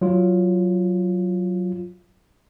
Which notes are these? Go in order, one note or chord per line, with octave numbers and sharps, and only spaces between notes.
F#3 F4